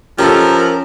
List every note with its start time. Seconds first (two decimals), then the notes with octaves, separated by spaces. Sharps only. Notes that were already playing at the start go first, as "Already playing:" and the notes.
0.18 F3 C#4 G4 A4 A#4